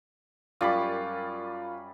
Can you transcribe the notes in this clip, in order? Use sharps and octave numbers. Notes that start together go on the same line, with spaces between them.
F#2 G3 F4 D5 B5